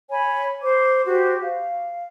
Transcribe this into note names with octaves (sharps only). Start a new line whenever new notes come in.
C#5 G#5 B5
C5 D6
F#4 G4 C5
F5